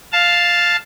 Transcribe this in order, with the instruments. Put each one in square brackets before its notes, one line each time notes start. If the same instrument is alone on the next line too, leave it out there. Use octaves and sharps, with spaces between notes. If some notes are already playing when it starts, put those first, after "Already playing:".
[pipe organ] F5 A5